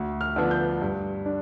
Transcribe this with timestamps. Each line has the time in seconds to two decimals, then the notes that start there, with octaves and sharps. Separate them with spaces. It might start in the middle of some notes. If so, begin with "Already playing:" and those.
Already playing: D2
0.21 F6
0.36 D3 F3 B3 D4
0.51 G6
0.82 G2
1.26 D4